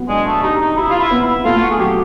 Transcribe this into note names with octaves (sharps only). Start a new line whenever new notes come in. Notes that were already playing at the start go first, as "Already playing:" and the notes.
Already playing: F#3 B3
G#3 D4
A3
D#4 G4
D#4
E4 G4
F4
E4
B3
E4
A3 F4
F#4
G#4
F#3 G4